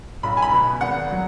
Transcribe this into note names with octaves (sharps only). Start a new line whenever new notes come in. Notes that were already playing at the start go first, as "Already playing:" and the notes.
B1 B5
G#5
B5
B2 B3
G#1 F#5
F#3